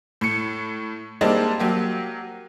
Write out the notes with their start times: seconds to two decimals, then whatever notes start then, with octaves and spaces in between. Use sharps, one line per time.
0.21 A2 C#7
1.21 G3 G#3 A#3 C4 D4 D#4
1.60 F#3 A#3 G4